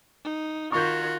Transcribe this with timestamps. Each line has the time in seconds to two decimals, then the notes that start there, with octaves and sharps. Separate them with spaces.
0.24 D#4
0.72 D#3 F4 F#4 C#6 G6